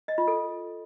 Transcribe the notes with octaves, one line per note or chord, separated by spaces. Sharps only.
D#5
F4
A4